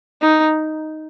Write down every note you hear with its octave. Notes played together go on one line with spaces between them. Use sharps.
D#4